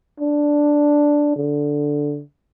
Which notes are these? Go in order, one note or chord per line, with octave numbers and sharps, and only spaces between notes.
D4
D3